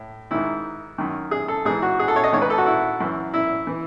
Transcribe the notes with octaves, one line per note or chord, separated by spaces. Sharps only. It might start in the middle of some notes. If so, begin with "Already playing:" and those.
Already playing: A2
G#2 D#3 E4
F#2 D#3
G#4
A4
G#2 E3 G#4
F#4
G#4
A4
C#5
D#5
G#2 D#3 C#5
B4
A4
F#4
E4
F#2 E3
E4
E3